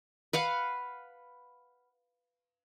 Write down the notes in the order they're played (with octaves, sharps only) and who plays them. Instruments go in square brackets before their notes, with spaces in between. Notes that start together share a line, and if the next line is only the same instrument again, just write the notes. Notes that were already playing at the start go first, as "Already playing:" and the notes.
[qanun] B4 F5 F#5